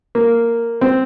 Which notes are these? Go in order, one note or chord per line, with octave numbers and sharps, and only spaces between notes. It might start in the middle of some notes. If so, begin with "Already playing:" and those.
A#3
C4